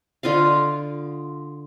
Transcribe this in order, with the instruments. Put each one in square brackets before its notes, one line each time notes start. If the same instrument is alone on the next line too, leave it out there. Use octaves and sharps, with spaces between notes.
[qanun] D3 F4 D#5 F5